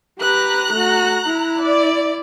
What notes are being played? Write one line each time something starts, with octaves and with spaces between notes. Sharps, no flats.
G4 B4 A#5 F#6
A3 F#4
E4
D5